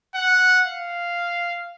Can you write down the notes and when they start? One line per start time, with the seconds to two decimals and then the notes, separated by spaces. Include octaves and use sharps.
0.15 F#5
0.66 F5